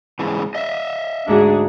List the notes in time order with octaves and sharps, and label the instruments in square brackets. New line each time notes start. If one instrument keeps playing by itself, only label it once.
[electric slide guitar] G#2 C#3 E3
D#5 E5
[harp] D2 G#2 F#4 [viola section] D4 G#4